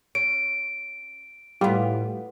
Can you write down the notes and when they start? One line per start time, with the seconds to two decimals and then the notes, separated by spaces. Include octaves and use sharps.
0.15 C#4 D7
1.61 A2 G3 B3 F4